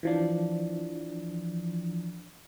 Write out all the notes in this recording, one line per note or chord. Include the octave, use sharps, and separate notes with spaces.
E3 F3 D4